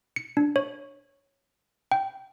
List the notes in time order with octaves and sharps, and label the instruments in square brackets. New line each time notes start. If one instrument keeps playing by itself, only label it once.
[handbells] C#7
D4
C#5
G5